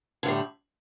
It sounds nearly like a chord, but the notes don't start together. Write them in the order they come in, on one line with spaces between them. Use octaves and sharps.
D3 A2 G3